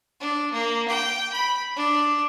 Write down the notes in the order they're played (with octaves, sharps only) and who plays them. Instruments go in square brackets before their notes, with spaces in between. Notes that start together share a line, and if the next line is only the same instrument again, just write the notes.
[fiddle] D4
A#3
G5
B5
D4